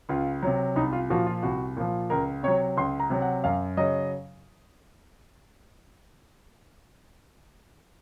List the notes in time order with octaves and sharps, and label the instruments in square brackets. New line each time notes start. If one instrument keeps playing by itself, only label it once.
[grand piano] C#2 F4
C3 F#3
C2 D#4
F4
A#2 F3 F#4
F4
C2 F#4
A#2 F3
C#2 A#4
C3 F#3 C#5
C#2 C6
A#5
C3 F#3
F#5
F#2 F5
C#3 F#3 D#5